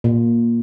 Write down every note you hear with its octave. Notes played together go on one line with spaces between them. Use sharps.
A#2